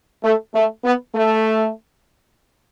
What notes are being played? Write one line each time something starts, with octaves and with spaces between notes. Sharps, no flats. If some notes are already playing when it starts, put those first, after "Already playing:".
A3
A3
B3
A3